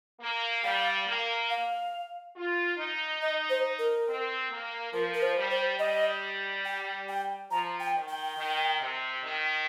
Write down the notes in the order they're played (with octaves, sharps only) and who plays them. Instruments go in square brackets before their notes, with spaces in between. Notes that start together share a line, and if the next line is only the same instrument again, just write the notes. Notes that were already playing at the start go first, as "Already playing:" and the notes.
[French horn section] A#3
[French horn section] G3 [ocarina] F5
[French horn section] A#3
[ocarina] F5
[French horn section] F4
D#4
[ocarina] D#5
C5
A#4
[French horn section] C4
A#3
[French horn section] F3 [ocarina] A#4
[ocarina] A#4
C5
[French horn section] G3
[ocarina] C5
[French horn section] G3 [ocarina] D#5
[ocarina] G5
G5
[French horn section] F3 [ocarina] A#5
[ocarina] G5
[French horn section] D#3
[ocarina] G5
[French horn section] D#3
C3
D#3